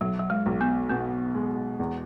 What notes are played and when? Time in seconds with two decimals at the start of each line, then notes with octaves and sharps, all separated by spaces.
0.01 B1 F#3
0.19 F#3
0.30 G#3
0.46 B1
0.61 B3
0.89 B2 B3
1.35 G#3
1.79 E2